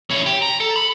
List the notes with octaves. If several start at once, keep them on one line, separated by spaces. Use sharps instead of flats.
C#4 E4
G4
A#5
A4
B5